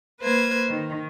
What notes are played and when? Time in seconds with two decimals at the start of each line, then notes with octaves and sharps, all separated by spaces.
0.20 A#3 B4 C5 G#6
0.68 D#3